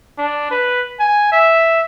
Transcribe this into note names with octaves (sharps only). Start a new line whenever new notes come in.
D4
B4
G#5
E5